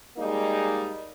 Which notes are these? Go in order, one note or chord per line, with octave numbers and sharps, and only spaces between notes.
G3 G#3 A#3 D#4